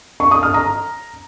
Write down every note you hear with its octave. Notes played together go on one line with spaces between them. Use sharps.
C#6
D#6
F6
A#5